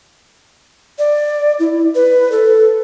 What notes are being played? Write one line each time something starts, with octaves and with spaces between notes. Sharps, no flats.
D5
E4
B4
A4